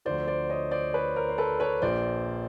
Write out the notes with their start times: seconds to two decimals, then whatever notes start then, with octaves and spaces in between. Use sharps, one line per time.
0.05 D2 D3 F3 C5 D5
0.27 C5 D5
0.50 C#5 D#5
0.71 C5 D5
0.94 B4 C#5
1.16 A#4 C5
1.29 C5
1.38 A4 B4
1.60 B4 C#5
1.82 A#1 A#2 F3 C5 D5